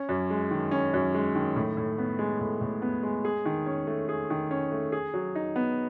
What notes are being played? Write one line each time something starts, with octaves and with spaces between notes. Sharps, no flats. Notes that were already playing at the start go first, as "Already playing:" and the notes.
Already playing: C#4
F#2
G#3
D#3
C#4
F#2
G#3
D#3
A2
A2
B3
G#3
A2
A2
B3
G#3
G#4
D#3
C#4
A3
G#4
D#3
C#4
A3
G#4
F#3
D#4
B3